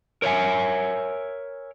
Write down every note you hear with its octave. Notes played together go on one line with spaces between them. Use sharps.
A#4 C#5 D5 E5 G#5